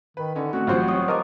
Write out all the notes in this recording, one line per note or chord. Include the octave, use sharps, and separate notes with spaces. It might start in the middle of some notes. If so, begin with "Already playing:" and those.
D#3 B4
D3 C#4 D#4
A3 C4 C#4 F#4
A1 F#3 G3 C4 F4 C6
C#5 C#6 D#6
F3 A#4 D#5 D6 D#6